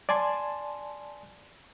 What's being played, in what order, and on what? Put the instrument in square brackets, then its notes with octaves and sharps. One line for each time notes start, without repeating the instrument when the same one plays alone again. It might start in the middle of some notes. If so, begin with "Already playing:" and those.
[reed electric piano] D5 G#5 A5 C6